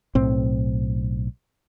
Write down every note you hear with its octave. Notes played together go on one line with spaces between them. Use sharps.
B1 A2 C4